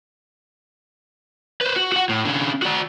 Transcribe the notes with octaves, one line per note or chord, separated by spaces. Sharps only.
B4 C5
F#4
F#4 F#5
A2
D3 C#4
F#4 D5